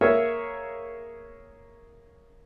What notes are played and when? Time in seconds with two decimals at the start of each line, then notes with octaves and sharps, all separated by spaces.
0.01 A#3 G#4 A#4 C#5 E5